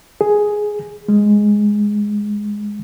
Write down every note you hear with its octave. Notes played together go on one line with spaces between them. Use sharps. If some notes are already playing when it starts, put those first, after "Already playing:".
G#4
G#3